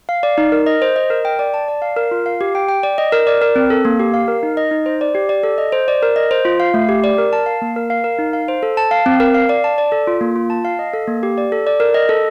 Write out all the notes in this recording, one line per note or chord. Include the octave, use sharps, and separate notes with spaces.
F5
D5
D#4
A#4
D#5
C5
D#5
A#4
G5
D5
A5
D5
F5
A#4
F4
F5
G4
G5
G5
D5
D#5
A#4
D5
A#4
C4
A4
A#3
G4
F5
A#4
D#4
D#5
D#4
C5
D5
G4
D5
A4
D#5
C5
D5
A#4
D#5
C5
F4
F5
A3
G4
D5
A#4
A5
F5
A#3
A#4
F5
A#4
D#4
F5
C5
A4
A5
F5
C4
A#4
F5
D5
A5
D5
A4
F4
A#3
F4
A5
F5
D#5
A4
A#3
G4
D5
A4
D5
A#4
D#5
A4